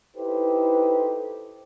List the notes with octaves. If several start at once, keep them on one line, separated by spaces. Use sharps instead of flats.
D#4 E4 G4 A4 B4 C5